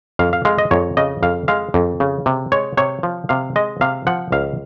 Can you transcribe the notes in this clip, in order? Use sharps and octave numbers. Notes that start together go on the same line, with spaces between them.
F2 F5
F5
G#3 F5
D#5
F2 C#5
C#3 D#5
F2 F5
G#3 F5
F2
C#3
C3
G#3 C#5
C3 C#5
F3
C3 F5
G#3 D#5
C3 F5
F3 F#5
C#2 F5